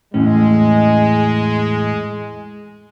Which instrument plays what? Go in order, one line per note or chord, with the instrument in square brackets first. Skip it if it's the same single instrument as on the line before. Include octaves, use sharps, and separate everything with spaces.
[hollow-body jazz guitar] E2 A2 C#4 [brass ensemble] G#3